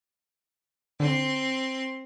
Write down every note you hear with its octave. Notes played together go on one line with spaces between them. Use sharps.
D3 C4 C6